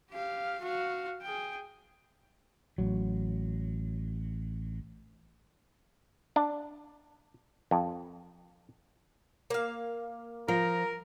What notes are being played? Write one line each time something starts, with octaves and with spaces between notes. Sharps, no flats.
G4 F5
F#4 F5
G#4 G5
A1 F#3
D4
F2
A#3 F5
F3 A#4 A#5